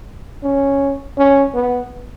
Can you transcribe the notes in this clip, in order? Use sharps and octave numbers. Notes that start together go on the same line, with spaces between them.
C#4
C#4
B3